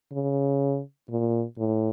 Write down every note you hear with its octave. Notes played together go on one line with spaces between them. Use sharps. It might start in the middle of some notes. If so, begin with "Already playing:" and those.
C#3
A#2
A2